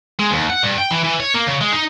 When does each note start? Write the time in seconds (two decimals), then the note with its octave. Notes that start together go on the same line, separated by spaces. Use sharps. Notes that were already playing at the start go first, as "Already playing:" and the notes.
0.19 G#3
0.31 D#2
0.50 F#5
0.63 G2
0.78 G5
0.91 E3
1.04 E3
1.20 C#5
1.35 A#3
1.47 C#3
1.61 G#3
1.73 D#4